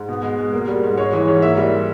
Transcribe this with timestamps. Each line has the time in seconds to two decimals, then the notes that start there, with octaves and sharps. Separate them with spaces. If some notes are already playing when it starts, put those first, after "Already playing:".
Already playing: G#2
0.09 B2
0.23 G#3
0.38 G#3
0.53 A#3
0.68 G3
0.83 G#2
0.97 G#3 C#5
1.13 E3
1.28 G#2
1.42 A#3 E5
1.57 G3